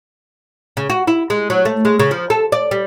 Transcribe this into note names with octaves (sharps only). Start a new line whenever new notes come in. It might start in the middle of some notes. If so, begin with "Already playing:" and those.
C#3
F#4
E4
G#3
F#3
A3
G#3
C#3
F3
A4
D5
G3